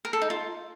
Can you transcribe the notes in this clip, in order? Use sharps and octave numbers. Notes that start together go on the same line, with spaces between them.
A#4
A4
D#4
F4